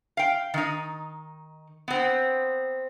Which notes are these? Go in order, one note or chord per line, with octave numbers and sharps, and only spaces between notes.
F5 G5
D#3 D#4
B3 C4